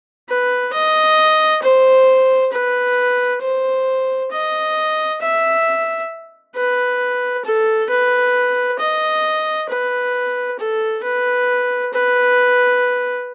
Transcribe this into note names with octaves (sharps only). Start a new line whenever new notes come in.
B4
D#5
C5
B4
C5
D#5
E5
B4
A4
B4
D#5
B4
A4
B4
B4